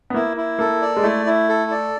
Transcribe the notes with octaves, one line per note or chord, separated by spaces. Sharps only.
B3
A#3 E4
E4
A#3 A4
D5
G#3
A3 E4
E4
A4
D5